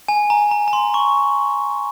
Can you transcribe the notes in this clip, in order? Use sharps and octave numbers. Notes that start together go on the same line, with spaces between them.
G#5
A#5
A#5
A#5
C6
C#6